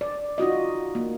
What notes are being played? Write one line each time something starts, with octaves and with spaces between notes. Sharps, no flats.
D5
D#4 F4 F#4 D#5
A#3